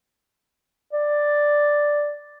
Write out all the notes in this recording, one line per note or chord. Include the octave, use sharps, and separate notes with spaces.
D5